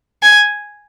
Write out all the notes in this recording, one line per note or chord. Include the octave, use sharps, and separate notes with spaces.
G#5